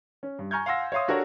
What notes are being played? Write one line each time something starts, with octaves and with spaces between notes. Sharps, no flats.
C#4
G2
G#5 A#5 C#6 F6 G6 G#6
F5 F#5 G#5 C6 E6 A#6
C#5 E5 F5 C6 D#6
D4 F#4 G4 A4 A#4 C#5